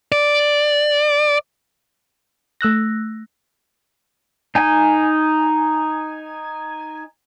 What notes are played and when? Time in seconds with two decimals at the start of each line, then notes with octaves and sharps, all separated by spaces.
0.12 D5
2.61 A3 E6 F#6 A#6
4.55 D#4 G#5